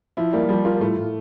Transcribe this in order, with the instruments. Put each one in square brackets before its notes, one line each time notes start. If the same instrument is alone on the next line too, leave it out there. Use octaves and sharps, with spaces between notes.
[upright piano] F3 [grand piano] E4
[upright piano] G3 [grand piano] A#3
[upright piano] F3 [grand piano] G3
[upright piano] A#3 [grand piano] F4
[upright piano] A#3
[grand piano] A2 [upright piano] A3
[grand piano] A2